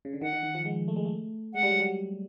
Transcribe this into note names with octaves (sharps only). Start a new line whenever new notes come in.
C#3
D3
D#3 F#5
D#3
D#3
F3
G#3
A3
G#3
A3
G#3 F#5
G3
F#3
G3